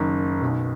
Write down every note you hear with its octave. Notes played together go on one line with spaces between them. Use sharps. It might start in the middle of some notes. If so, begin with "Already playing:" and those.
Already playing: F#1 F#2 D#3
B1 B2